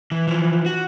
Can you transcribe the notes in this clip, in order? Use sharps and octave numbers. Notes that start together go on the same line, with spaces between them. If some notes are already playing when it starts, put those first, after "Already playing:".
E3
E3 F3
F#4